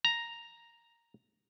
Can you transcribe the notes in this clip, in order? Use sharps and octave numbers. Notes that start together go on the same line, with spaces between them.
A#5